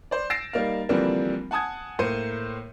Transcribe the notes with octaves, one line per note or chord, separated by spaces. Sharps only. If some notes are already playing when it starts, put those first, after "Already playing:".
C5 D5
E6 A6 A#6 C7 D7 E7
G3 A#3 D#4 F5
D3 E3 F3 G3 A#3 C4
F#5 G#5 A5 D#6 G#6
A2 A#3 C5 C6 C#7 D#7